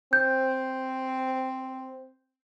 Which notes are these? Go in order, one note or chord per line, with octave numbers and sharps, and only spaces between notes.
C4 G6